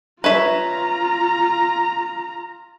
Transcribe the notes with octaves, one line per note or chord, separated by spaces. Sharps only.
F4 B4 C#5 E5 A#5